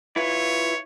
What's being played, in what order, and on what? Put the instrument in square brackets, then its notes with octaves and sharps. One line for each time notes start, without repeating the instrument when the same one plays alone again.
[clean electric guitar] E4 F4 B4 [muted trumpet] C#5